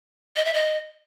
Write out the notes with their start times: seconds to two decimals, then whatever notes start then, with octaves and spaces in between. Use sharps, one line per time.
0.36 D#5
0.45 E5
0.54 D#5